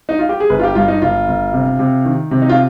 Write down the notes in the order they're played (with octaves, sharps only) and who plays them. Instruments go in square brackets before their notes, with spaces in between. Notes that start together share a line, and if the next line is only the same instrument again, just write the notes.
[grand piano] D#4
F4
G4
G#4
G1 B4
F4
G4
G2 F4
D#4
G1 F4
G1
C3
C3
D#3
C3
D#4
F4